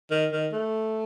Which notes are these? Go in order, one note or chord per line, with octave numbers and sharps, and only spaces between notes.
D#3
D#3
A3